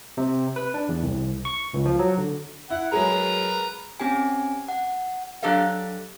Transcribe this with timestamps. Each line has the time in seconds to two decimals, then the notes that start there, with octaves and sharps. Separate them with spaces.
0.17 C3
0.56 B4
0.74 D4
0.89 E2
1.03 C2
1.45 C#6
1.74 C#2
1.85 F3
1.99 F#3
2.18 D3
2.70 E4 F#5
2.92 F#3 G#3 G#4 A#4 B4 A#5
4.00 C4 C#4 G4 G#5
4.68 F#5
5.42 F#3 D4 G4 A4 D#5 F5